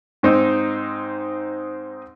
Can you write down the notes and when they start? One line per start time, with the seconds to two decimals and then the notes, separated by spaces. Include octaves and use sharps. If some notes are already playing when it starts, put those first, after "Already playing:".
0.23 G#2 C4 D#4